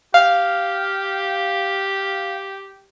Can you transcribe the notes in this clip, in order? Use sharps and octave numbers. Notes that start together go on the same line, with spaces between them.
G4 F5